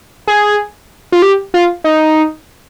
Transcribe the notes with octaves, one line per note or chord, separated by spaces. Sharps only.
G#4
F4
G4
F4
D#4